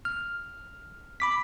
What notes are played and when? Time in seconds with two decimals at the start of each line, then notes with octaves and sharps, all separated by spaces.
0.05 F6
1.20 B5 D6 B6